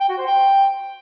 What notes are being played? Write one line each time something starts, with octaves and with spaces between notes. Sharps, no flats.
G5
F#4
C5
G5